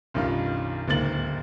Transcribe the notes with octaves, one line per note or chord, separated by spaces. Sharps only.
B1 F#2 D#3 G3 D4 F4
D1 C#2 G#2 A#3 A6 F#7